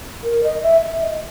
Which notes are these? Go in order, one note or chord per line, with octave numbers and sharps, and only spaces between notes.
A#4
D#5
E5
E5
D#5